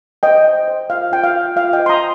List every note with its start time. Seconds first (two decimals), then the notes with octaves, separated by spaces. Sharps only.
0.23 C5 D#5 G5
0.46 C5
0.68 C5
0.90 F4 F5
1.12 F4 G5
1.24 F5
1.34 F4
1.56 F4 F5
1.73 D#5 G5
1.79 C5
1.86 C6
1.89 A#5 D#6